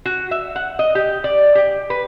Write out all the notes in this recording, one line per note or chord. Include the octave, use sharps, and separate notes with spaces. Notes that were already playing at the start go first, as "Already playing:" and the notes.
F#4
E5
F#5
D#5
G4
D5
G4
B4